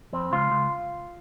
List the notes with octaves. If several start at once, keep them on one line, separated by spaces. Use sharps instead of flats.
F2 C4
C#2 F4
C#2